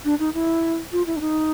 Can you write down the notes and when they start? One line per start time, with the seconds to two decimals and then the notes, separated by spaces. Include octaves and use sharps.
0.05 D4
0.20 D#4
0.34 E4
0.92 F4
1.07 E4
1.16 D4
1.21 D#4